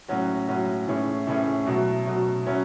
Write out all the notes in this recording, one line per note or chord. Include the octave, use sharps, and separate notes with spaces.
A2 F#3 C#4 F#4
A2 F#3 C#4 F#4
A2 E3 A3 C#4 G#4
A2 E3 A3 C#4 G#4
B2 F#3 A3
B2 F#3 A3
F#3 C#4 E4